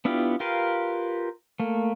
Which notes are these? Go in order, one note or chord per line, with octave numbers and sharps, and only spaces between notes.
B3 D4 E4 F4 G4
F4 G4 A#4 B4 F5
A3 A#3